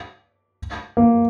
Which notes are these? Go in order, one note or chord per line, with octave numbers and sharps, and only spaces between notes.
A#3